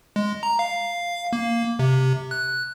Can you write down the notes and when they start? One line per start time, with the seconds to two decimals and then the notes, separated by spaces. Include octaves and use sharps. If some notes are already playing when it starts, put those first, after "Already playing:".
0.16 G#3
0.43 A#5
0.59 F5
1.33 A#3
1.79 C3
2.31 F#6